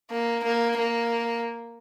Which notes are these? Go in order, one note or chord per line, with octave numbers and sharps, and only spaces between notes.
A#3
A#3
A#3